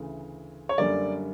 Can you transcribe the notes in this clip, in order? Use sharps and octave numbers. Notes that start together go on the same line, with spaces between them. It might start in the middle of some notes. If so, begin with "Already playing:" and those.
Already playing: D2 C#3 E3
C#5
F#2 D3 G3 A#3 D5